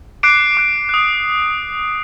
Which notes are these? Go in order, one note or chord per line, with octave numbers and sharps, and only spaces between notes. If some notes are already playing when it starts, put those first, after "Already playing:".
D6 F#6 C7 D7
D6 F#6
D#6 F#6